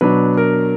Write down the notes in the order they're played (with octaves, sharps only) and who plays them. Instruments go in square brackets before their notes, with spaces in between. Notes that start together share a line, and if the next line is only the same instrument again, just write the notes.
[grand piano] B2 F#3 D4 B4
A#4